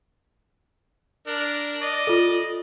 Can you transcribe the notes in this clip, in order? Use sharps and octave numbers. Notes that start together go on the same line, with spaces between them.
D4 A#4
D5 D#5
F4 A4